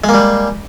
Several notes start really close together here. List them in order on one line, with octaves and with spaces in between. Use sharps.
G#3 A#3 G3